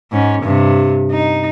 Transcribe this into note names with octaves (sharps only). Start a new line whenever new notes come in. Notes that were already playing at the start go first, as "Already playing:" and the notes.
G#2 C#4
G2 C3
D#4